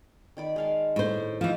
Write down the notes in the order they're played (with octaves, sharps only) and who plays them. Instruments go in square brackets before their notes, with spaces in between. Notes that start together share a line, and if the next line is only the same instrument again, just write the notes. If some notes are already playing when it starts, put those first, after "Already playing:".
[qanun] D#3 D5 B5
G#3 F5 A5
[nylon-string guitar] A2 C5
[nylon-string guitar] E3 F3 [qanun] D#5